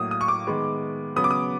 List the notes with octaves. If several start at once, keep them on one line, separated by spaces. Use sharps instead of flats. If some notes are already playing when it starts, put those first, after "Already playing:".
Already playing: A2 F#3 A#3 D#6
D#6
C#6
D6
D#3 G#3 B3
C#3 F#3 B3 D#6
D6
D#6